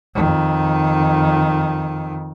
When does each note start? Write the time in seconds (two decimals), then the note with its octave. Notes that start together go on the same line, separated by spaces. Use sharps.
0.15 F2 D#3